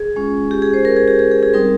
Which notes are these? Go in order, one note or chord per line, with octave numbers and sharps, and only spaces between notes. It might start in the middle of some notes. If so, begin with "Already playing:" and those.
Already playing: G#4
G#3 C#4 F4
G4
G#4
C5
A#4
G#4
G4
G#4
G#4
G#4
G3 C4 D#4 A#4